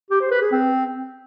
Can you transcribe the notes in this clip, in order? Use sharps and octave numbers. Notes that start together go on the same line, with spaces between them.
G4
C5
B4
G#4
C4